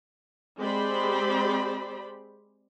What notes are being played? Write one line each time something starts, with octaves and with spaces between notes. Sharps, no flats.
G#3 C4 G4 C5 D5 B5